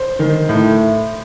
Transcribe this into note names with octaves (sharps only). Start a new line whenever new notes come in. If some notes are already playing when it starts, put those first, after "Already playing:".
Already playing: C5
D#3
A2